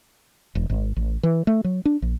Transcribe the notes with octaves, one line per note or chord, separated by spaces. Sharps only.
E1
G#1
A1
E3
A3
F#3
D4
A#1